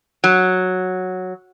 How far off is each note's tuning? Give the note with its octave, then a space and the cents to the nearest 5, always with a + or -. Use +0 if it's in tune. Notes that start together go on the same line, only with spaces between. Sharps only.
F#3 -5